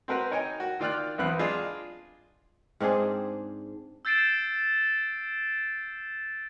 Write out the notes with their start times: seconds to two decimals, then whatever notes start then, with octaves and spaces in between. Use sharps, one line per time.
0.08 C4 F#4 A#4 B4
0.31 D#4 A#4 C#5 D#5 G5 G#5
0.60 F#4
0.80 D#3 F4 D5 G5 F6 F#6
1.18 B1 E2 B3 C4 F#6
1.39 G#3 D4 F4 G#4 D#5
2.80 G#2 C4 D4 G#4
4.05 E6 G6 A6 C7 D7 E7